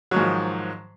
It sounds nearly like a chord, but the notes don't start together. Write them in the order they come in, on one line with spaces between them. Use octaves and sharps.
F#3 D#3 G#2 F3